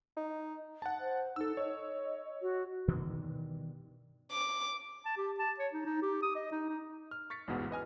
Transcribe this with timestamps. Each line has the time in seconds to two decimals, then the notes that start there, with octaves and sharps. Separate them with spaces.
0.17 D#4
0.82 F#5 A5
1.00 C5
1.36 D#4 A4 E6
1.57 C#5 D#5
2.42 F#4
2.88 G2 B2 D#3 E3
4.31 D6
5.06 A5
5.17 G4
5.39 A5
5.59 C#5
5.73 D#4
5.85 D#4
6.02 G4
6.23 D#6
6.36 D#5
6.52 D#4
6.69 D#4
7.11 F6
7.30 C#6 A6 B6 C#7
7.47 A1 E2 G#2 B2 F#5
7.71 B4 D#5 G#5 F6